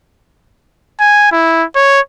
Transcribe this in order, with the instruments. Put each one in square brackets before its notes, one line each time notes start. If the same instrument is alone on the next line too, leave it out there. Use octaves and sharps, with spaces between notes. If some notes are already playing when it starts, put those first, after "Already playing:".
[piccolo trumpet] G#5
E4
C#5